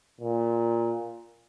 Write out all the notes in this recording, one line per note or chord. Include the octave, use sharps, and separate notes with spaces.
A#2